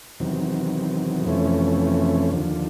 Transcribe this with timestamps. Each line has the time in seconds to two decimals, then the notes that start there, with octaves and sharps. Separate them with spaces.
0.20 E2 C3 D#3 F#3
1.25 F2 C3 E3 A3 C#4
2.31 D#2 D3 F3